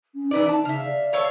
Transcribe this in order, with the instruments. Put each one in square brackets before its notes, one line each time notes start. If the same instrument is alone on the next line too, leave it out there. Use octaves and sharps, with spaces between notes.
[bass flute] C#4
[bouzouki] E3 B3 D5 [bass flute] D#4
[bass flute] D#4 [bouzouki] A5
[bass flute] C#3 [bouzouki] E5 F5
[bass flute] D5
[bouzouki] A4 C#5 F5